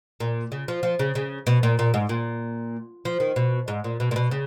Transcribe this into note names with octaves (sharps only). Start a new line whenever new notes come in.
A#2
C#3
F3
F3
C#3
C#3
B2
A#2
A#2
G#2
A#2
F3
D#3
B2
G#2
A#2
B2
A#2
B2
C#3